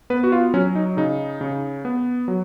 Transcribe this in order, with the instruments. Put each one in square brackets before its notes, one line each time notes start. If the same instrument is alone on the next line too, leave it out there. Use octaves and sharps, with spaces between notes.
[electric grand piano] B3 B4
F#4
F4
F#3 C#4
D#4
C#3 D#4
C#3
B3
F#3